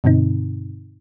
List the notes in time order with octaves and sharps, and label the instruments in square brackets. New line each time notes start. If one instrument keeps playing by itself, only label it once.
[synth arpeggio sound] G2 B2 D3 C4 D#4